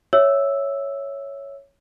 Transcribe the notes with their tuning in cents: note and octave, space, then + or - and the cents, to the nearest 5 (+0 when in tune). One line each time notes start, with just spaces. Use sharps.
C#5 +0 E5 +0 E6 +0